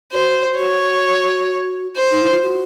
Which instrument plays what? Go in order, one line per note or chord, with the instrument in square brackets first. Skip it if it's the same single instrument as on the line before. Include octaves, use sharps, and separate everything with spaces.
[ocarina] F#4 [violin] C5
[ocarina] F#4 [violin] C#5
[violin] C5
[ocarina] D#4
E4
F4
F#4